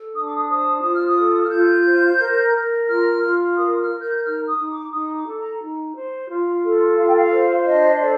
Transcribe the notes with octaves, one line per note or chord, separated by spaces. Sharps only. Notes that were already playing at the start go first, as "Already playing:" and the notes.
Already playing: A4
D4 D#6
D6
D#6
C5 D#6
F4 D#6
F6
D#6
A4
F6
F4 G6
C5
A#4
A#4
F4 F6
F4
A#4 D#6
F6
A#4
G6
G6
D#4 F6
D#6
D#4
D6
D#4 D#6
D6
A4
A#5
D#4
C5
F4
A4
F4 F5
G5
F5
C5
D4 D#5
A4 D5